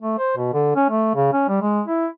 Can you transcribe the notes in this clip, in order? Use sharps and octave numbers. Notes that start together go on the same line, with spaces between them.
A3
C5
B2
D3
C#4
A3
C#3
C#4
G3
G#3
E4